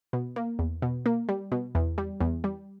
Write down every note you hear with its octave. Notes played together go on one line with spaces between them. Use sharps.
B2
A#3
E2
B2
A#3
G3
B2
E2
G3
E2
G3